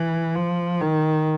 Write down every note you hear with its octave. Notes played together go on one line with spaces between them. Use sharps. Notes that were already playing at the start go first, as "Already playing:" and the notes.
Already playing: E3
F3
D#3